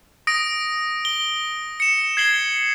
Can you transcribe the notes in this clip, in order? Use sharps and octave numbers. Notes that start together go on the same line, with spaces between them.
D#6 A#6 D7
G7
C#7 E7
G#6 C7 F#7 G7